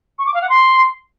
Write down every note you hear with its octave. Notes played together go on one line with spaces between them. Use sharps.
C#6
D6
F5
F#5
C6